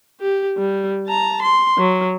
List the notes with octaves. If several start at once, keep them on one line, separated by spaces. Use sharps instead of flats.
G4
G3
A5 A#5
C6
F#3